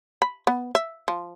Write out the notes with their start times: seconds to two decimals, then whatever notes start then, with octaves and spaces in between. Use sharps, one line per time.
0.22 B5
0.47 B3
0.75 E5
1.08 F3